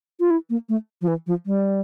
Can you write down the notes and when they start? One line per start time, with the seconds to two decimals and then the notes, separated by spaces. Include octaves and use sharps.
0.20 F4
0.30 E4
0.50 A#3
0.69 A3
1.01 F3
1.08 E3
1.27 F3
1.46 G3